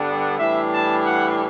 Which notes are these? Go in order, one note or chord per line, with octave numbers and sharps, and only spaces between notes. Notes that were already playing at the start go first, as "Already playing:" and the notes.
Already playing: G2 D3 G3 B3 D4
A2 E3 G3 D4 E5
A5
F#5